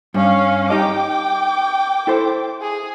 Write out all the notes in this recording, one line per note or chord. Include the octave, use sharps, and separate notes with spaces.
G2 C#4 F5
D#4 G4 D#5 G5 D6
E4 A4 C5
G#4